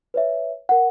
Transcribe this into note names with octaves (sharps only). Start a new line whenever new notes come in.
B4 C#5 E5
A#4 F#5